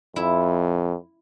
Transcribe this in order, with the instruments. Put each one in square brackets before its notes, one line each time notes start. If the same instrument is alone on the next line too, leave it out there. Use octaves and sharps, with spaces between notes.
[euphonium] F2 [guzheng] E4